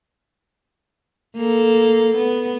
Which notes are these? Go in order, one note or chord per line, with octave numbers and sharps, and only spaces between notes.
A#3 A4
B3